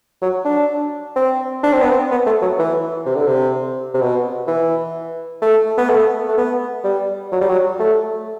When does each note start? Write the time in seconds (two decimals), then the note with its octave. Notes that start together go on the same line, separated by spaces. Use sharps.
0.21 F#3
0.45 D4
1.16 C4
1.63 D4
1.73 C4
1.81 B3
1.90 C4
2.11 B3
2.26 A3
2.42 F#3
2.59 E3
3.05 C3
3.15 D3
3.26 C3
3.94 C3
4.01 B2
4.48 E3
5.42 A3
5.77 B3
5.90 A3
6.28 A3
6.37 B3
6.84 G3
7.32 F#3
7.41 G3
7.49 F#3
7.79 A3